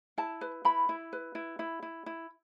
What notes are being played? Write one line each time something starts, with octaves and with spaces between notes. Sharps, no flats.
E4 A5
B4
E4 B5
E4
B4
E4
E4
E4
E4